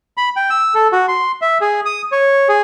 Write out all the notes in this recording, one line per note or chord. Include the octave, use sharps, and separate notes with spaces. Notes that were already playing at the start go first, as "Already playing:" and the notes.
B5
G5
E6
A4
F#4
C6
E5
G#4
D#6
C#5
G#4